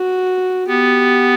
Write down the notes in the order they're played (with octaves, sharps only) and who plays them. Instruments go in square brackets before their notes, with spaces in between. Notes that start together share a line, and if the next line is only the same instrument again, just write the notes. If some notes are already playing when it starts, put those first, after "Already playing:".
Already playing: [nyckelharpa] F#4
[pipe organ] B3 [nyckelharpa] G4